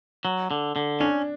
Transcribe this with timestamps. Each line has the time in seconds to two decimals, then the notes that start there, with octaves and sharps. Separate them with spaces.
0.25 F#3
0.51 D3
0.76 D3
1.00 C#4 D4